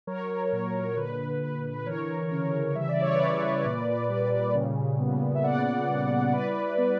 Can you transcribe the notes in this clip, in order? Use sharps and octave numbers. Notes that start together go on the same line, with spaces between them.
F#3 A#4 C#5
A#2
C#5
D3 B4
D3
B4
E3 A#4 C#5
C#3
G3 E5
D5
C#5
C#3 B4 D5
A#2
G3
C#3
B3
E5
A#2 D5 F#5
G3
E4 B4 D5
B3